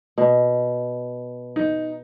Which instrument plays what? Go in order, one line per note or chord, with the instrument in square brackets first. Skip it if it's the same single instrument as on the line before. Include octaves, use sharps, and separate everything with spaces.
[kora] B2
[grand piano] D#4